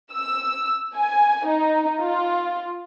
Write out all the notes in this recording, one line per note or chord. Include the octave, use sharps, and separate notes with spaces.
E6
G#5
D#4
F4